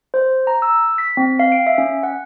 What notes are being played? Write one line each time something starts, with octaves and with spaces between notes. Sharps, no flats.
C5
A#5
E6
B6
C4
F5
D7
E5
C#4
F#5